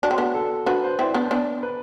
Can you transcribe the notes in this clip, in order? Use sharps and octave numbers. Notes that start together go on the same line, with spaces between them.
D4 F#4
C4
B3 D4
A4
D4 F#4 B4
C5
C4 E4 D5
B3 D4
B3 D4 D5
B4